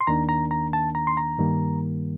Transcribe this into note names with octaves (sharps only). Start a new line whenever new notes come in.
C6
D#2 D#3 A#3 D4 A#5
A#5
A#5
A5
A#5
C6
A#5
G2 D#3 G3 A#3